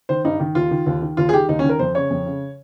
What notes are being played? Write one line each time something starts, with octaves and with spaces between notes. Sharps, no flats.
D#3 C5
G2 D#4
D#3
D#2 F4
D#3
D#2
D#3
D#2 F4
G#4
D#3 G4
D#2 D#4
C#4
D#3
A#4
F2 C5
C#3 C#5
F2
C#3